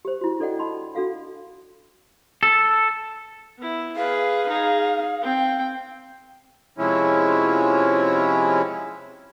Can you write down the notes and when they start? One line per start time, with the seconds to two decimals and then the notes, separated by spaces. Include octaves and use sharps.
0.05 G4 C5
0.21 E4 F#4
0.40 D4 A4 D5 D#5 F#5 G5
0.59 D4 D#5 A5 B5 C6
0.95 D4 F#4 A4 F5 F#5
2.43 A4
3.58 B3 E4
3.96 G#4 B4 F5
4.49 D#4 G#4
5.21 C4 G5
6.78 C3 F3 G#3 C#4 E4